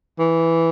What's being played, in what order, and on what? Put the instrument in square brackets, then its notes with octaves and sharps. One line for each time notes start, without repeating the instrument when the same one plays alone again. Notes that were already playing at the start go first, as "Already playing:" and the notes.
[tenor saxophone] E3